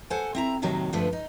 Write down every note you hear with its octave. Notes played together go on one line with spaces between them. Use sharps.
A4 C5 F#5 G#5
C4 E4 A#5
A2 C3 D#3 F#3 A#3
G2 D3 F3 A3 D4 B4
D#4